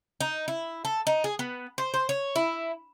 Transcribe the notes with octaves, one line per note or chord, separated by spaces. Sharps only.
D#4
E4
A4
D#4
G#4
B3
C5
C5
C#5
E4